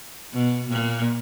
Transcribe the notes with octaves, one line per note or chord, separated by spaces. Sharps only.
B2
A#2